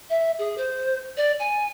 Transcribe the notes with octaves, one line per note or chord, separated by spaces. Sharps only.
E5
G#4
C5
D5
G#5